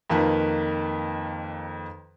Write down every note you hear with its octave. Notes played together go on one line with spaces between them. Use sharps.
F2 D#3 A#3 B4